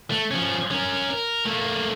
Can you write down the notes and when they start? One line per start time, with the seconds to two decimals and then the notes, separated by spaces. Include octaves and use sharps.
0.11 A3
0.31 F3 C#4
0.71 C#4 A#4
1.10 A#4
1.45 A3 A#3